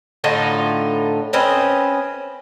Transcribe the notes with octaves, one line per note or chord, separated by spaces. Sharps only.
A2 D3 D#4 F4
C4 C#4 B4 D#5